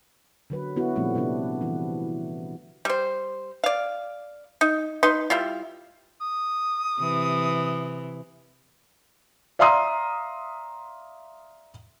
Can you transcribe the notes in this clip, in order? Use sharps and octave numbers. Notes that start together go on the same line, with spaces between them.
D3 F#3 B4
B3 E4 F#4
A#2 F3 G3 A3 C4
C3 G3 B3 D4
E3 E4
G3 C5
D5 F5
D#4
D#4 B4 C6
G3 E4 F4
D#6
C3 E3
D5 E5 F5 A#5 C6 D#6